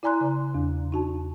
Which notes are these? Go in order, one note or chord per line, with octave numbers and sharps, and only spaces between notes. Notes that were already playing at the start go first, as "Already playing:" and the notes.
E4 D5 G#5 A#5 C6 F#6
C#3
E2
D#4 F#4 A5